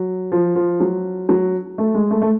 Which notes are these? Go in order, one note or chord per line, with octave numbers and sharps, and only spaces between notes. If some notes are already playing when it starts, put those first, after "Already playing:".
Already playing: F#3
F3
F3
F#3
F#3
A3
G#3
A3
A3